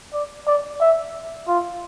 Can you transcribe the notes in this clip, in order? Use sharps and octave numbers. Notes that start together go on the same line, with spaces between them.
D5
D5
E5
F4